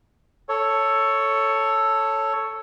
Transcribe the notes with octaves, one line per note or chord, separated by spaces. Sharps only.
A4 C#5